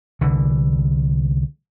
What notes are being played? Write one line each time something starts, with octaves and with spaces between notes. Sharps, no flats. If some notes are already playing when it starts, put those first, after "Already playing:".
C2 D3 E3